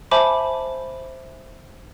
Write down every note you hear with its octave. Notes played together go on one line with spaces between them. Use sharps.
C5 E5 G#5 A5 B5 D6